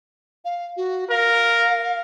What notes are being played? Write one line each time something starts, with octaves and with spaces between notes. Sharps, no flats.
F5
F#4
A#4 F5